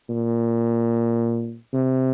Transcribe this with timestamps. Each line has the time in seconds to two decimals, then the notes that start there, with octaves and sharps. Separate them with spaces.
0.09 A#2
1.73 C3